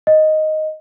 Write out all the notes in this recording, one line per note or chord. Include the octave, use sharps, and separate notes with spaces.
D#5